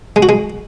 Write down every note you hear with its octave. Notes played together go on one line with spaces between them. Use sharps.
G#3
F#4
G#3